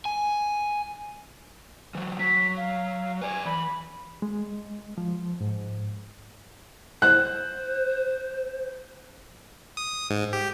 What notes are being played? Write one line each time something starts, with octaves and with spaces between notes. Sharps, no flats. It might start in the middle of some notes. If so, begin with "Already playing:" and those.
G#5
E3 F#3
F#3 B6
F5
B4 D5 G#5
E3 B5
G#3
F3
G#2
C5 F#6
D#6
G#2
G4